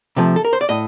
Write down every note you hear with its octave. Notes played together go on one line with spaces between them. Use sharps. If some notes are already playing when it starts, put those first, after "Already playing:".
C3 F3 A3
A4
A#4
C5
D5
A2 D#5